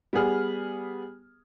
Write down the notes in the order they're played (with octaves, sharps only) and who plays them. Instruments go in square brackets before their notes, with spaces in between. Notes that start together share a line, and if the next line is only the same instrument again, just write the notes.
[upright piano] G3 B3 G#4 F6